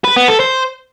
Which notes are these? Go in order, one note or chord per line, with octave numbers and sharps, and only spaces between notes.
B4
B3
A4
C5